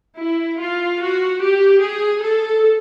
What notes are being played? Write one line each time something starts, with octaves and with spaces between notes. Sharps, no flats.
E4
F4
F#4
G4
G#4
A4